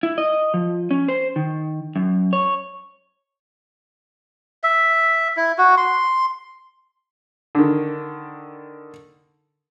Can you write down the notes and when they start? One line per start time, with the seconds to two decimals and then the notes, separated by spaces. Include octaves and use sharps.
0.03 E4
0.18 D#5
0.54 F3
0.91 C#4
1.08 C5
1.36 D#3
1.96 F#2
2.33 C#5
4.63 E5
5.37 E4
5.58 F#4
5.77 C6
7.55 D3 D#3